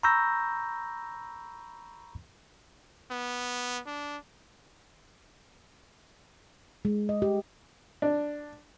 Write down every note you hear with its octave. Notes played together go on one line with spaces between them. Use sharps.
A#5 B5 C#6 E6 G6 A#6
B3
D4
G#3
D#5
G4
D4